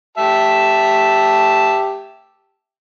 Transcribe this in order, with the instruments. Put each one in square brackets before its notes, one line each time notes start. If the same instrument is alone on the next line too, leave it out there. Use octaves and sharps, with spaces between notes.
[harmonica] G4 E5 A5